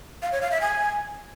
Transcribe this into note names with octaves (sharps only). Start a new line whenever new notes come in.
F5
C#5
F5
E5
G#5